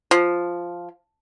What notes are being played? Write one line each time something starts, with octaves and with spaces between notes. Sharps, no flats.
F3